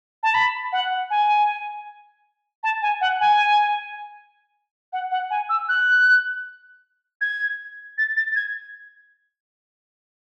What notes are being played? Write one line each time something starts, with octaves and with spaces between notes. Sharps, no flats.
A5
B5
F#5
G#5
A5
G#5
F#5
G#5
F#5
F#5
G#5
E6
F#6
G#6
A6
A6
G#6